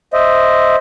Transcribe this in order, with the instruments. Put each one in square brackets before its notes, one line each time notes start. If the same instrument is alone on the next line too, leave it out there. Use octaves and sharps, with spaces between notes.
[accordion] C5 D#5 E5